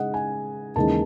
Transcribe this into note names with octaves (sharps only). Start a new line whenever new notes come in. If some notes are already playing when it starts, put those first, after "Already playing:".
Already playing: C#3 G#3 D#4 D#5 F#5
G#5
D#2 C#3 E3 G#3 D#4 A5